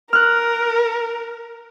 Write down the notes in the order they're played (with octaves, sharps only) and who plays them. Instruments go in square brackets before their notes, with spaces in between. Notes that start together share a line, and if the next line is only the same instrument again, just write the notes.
[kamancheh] A#4 [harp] F6 F#6